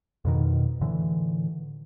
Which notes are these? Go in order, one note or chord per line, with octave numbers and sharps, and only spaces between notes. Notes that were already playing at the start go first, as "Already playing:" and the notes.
F2 B2 D#3
A2 D3 E3